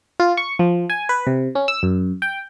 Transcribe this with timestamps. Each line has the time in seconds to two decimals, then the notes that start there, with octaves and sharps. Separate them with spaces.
0.20 F4
0.37 C#6
0.59 F3
0.90 G#5
1.09 B4
1.27 C3
1.55 C#4
1.68 E6
1.83 F#2
2.22 G5